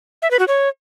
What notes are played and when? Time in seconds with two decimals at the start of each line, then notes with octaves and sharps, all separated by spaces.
0.22 E5
0.31 B4
0.39 F#4
0.48 C#5